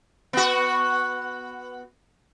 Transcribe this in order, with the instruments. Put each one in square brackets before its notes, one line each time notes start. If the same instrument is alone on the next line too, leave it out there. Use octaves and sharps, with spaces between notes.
[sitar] B3 F#4